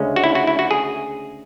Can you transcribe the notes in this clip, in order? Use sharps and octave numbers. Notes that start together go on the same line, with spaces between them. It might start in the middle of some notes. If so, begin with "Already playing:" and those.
Already playing: D2 C#3 G#3 C#4
F#4
E4
F#4
E4
F#4
G#4